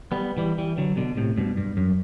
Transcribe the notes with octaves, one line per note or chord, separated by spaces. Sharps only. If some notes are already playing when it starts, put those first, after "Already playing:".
G3 B3
E3 G3
E3 G3
D3 F#3
B2 D3
A2 C3
G2 B2
G2
F#2